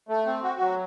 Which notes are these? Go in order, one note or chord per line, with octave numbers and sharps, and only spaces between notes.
A3
C4
F#4
F#3